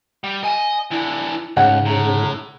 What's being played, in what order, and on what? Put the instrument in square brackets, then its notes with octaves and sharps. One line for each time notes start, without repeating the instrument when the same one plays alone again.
[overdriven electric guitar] G3
[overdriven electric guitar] D#5 [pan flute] G#5
[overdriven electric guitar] E3 D4 [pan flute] E4
[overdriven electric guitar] C#2 [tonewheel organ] G#2 C#3 [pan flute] C#5 [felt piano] F#5
[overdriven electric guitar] A2 [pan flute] A#5